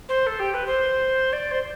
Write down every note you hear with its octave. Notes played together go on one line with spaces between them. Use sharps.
C5
A4
G4
B4
C5
D5
C5